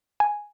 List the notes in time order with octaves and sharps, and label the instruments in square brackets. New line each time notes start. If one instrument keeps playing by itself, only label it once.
[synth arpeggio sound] G#5